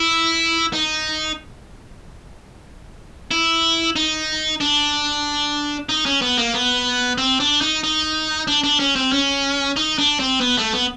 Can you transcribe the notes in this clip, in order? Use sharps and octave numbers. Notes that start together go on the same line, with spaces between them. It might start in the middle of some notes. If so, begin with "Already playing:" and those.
Already playing: E4
D#4
E4
D#4
D4
D#4
C#4
B3
A#3
B3
C4
D4
D#4
D#4
D4
D4
C#4
C4
C#4
D#4
D4
C4
B3
A3
B3